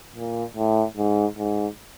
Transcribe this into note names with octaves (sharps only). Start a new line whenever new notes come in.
A#2
A2
G#2
G#2